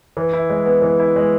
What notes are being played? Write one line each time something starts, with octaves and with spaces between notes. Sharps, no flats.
E3
E4
G#3
B3
E3
E4
G#3